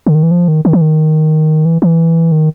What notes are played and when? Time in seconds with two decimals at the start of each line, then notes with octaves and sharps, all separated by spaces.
0.06 D3
0.15 D#3
0.23 E3
0.31 F3
0.48 D#3
0.65 D#3
0.73 E3
0.81 D#3
1.65 E3
1.82 E3
2.32 D#3